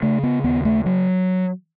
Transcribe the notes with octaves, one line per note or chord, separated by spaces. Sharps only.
C#3 A3
B3
D#2 B3
A3
F#3